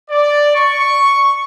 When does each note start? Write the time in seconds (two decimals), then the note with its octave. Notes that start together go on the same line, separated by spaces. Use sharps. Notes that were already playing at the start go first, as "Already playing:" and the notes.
0.10 D5
0.56 C#6